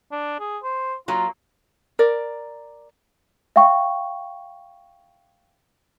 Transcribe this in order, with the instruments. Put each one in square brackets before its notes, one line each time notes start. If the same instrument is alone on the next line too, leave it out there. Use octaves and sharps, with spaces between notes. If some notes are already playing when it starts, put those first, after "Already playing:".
[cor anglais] D4
G#4
C5
[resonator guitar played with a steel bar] F#3 A#3 [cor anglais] F4
[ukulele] A#4 D5
[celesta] E5 F5 G5 C#6